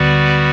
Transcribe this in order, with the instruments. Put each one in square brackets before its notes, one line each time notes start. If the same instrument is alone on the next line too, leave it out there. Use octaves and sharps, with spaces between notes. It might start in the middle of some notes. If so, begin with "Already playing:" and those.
Already playing: [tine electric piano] D2 D3 [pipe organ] G3 B3 F#4 B4 D5